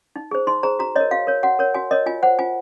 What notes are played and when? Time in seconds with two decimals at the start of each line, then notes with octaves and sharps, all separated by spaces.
0.16 D#4
0.31 G#4 C5
0.47 D#4 C6
0.63 G#4 C5 A#5
0.79 F#4 A#5
0.95 A#4 C#5 D#5
1.11 F#4 F5
1.27 A#4 C#5
1.43 F#4 F#5
1.59 A#4 C#5
1.74 F#4 G#5
1.91 A#4 C#5 D#5
2.06 F4 G#5
2.23 C5 F#5
2.39 F4 G#5